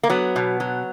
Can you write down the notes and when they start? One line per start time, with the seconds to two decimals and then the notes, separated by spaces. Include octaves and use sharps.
0.03 A#3
0.10 F#3 B3
0.36 B2
0.60 F#3